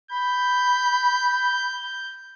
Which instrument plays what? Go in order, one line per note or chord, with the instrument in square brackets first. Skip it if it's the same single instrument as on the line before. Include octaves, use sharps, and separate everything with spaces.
[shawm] B5 [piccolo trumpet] G6